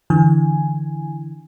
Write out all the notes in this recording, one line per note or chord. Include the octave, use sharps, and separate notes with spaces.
D3 E3 G#5